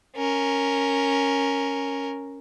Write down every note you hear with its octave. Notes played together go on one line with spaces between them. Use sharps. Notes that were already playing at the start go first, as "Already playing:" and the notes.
C#4 A#4